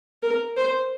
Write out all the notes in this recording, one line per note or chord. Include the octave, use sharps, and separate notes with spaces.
A#4
C5